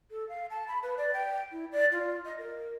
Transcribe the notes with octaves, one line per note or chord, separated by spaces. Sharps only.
A4
F5
A5
B5
B4
D5
G5
E4
D5
F4
D#5
A#4